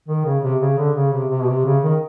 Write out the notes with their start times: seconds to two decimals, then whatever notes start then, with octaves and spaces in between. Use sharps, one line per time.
0.08 D#3
0.26 C#3
0.43 C3
0.61 C#3
0.78 D3
0.95 C#3
1.12 C3
1.30 C3
1.41 B2
1.48 C3
1.65 C#3
1.83 D#3